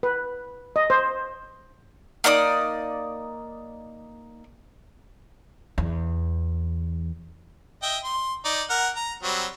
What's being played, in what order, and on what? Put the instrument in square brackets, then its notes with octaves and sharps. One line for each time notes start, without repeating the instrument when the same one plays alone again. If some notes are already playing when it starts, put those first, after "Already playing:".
[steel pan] B4
D#5
C5
[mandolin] A#3 D#4 D5 D#6
[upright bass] E2
[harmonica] D#5 E5 G5
C6
D#4 D5
A#4 F#5
A#5
F#3 G3 C4